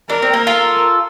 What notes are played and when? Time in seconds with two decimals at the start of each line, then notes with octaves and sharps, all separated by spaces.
0.09 D4 A#4
0.22 C4
0.34 A#3
0.47 F4 A4